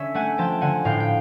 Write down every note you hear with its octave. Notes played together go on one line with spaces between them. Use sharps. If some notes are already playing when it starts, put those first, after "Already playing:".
Already playing: D3 C#4 E5
A3 F#5 G#5
F3 G5 A5
D3 F#5 G#5
A2 F5 G5
G5